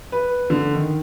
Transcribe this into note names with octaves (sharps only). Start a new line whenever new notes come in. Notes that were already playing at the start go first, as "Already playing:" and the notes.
B4
D3
D#3